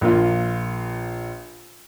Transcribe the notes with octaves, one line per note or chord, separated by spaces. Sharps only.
A#1 A#3 F4